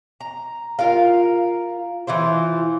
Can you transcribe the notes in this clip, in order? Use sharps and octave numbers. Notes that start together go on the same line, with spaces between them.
A#5
F4 A#4 F5
E3 E4 F4 C5